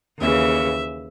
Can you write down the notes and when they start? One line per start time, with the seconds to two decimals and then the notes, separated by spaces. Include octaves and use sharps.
0.19 D#2 C#3 E3 E5